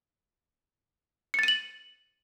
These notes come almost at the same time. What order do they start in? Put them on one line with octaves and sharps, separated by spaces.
C#7 A6 D#7 F#7